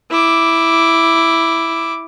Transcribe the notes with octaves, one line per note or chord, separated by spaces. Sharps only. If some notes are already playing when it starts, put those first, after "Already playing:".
E4 D6